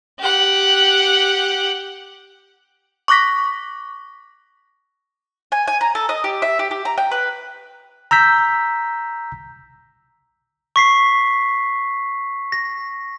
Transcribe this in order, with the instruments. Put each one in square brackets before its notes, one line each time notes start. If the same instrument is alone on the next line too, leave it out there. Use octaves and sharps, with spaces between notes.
[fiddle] G4 F#5
[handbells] C#6 D6 F#6 A#6 B6
[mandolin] G#5
G#5
A#5
A4
D#5
G4
E5
G4
G4
A#5
G5
B4
[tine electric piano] A#5 E6 G6 B6
[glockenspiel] C#6 B6 C7
A#6